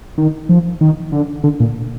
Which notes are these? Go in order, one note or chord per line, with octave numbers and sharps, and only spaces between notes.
D#3
F3
D#3
D3
D3
A#2